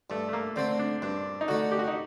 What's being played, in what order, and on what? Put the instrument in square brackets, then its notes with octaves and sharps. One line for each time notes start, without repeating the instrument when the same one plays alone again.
[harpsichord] G2 [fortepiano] A3
[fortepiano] A3
A#3
[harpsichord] D3 A3 [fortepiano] C4
[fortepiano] D4
[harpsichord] G2 [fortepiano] D4
[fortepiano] D#4
[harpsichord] D3 A3 [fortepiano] F#4
[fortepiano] G4
F#4
D#4